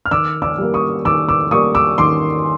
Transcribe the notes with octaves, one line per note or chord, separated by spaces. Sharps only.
F6
D#3 D6 E6
D6 E6
G3 A#3
C#6 D#6
D#3 D6 E6
D6 E6
G3 A#3 C#6 D#6
D6 E6
D#3 C6 D6